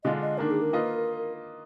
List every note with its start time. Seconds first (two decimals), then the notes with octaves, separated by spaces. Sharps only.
0.04 D3 G#3 D4 F4 D#5
0.22 D#5
0.38 D#3 A#3 D4 A#4
0.51 G#4
0.62 A#4
0.73 A#3 F4 B4 D#5